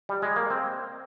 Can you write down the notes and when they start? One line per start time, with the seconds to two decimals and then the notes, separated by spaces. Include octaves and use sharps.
0.09 G3
0.22 G#3
0.36 A#3
0.50 C4